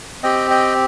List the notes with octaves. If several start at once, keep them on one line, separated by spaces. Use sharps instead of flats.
C4 G4 D#5 G5
D#5 G5